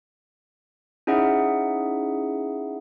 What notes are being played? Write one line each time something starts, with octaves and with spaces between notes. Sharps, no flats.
C#4 D#4 E4 G#4 E5 F#5